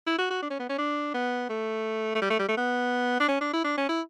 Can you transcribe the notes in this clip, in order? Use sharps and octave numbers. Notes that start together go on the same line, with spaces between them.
E4
F#4
F#4
D4
C#4
B3
C#4
D4
B3
A3
A3
G3
A3
G3
A3
B3
D4
C#4
D4
E4
D4
C#4
E4